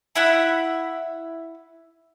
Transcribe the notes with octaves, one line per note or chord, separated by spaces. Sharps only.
E4 E5 F#5 B5